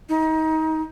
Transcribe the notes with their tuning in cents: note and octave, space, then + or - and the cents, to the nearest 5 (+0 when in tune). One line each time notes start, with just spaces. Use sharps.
D#4 +25